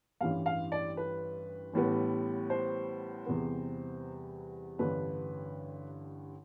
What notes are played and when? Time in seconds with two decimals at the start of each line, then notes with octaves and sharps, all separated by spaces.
0.21 A1 G2 E3 G3 F5
0.46 F5
0.72 D5
0.97 B4
1.73 A1 A2 G3 B3
2.50 C5
3.26 E2 C3 G3 B3
4.79 A1 G2 D3 B4